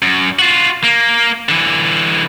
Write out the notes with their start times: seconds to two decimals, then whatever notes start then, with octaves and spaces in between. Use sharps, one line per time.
0.02 F#2
0.39 F4 F#4
0.84 A#3
1.49 D3 E3